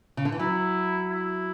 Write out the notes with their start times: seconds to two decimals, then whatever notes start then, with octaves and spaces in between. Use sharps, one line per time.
0.17 C#3
0.25 D3
0.32 E3
0.39 F#3 E4
1.10 E4